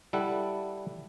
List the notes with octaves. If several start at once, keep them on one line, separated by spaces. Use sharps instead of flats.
G3 E4 A4 F#5